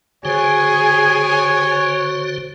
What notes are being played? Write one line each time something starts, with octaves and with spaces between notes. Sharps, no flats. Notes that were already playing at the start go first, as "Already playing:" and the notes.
D3 F#4 G#4 C5 C#5 G#5